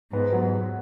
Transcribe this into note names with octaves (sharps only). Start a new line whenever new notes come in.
G#2 B3
F#3